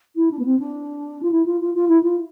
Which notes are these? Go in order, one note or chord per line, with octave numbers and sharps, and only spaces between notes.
E4
D4
B3
C4
D4
F4
E4
F4
F4
F4
E4
F4